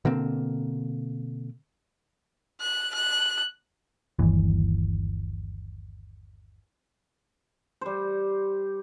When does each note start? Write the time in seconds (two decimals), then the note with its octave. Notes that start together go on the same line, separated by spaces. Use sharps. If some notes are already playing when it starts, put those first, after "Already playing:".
0.05 B2 D3 A#3 C4
2.61 F#6
2.95 F#6
4.19 G1 D#2 E3
7.81 G3 C5